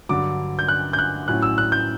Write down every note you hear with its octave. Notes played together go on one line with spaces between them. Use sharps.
G2 D3 F#3 D6
G6
F#6
G6
F#6
A2 F#3 C#4 E4 F#6
E6
F#6
G6